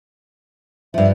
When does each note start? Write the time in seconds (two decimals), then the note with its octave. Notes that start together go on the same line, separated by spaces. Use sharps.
0.94 G2 F3 E5